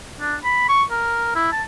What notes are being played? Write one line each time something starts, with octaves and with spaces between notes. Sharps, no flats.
D4
B5
C#6
A#4
E4
A5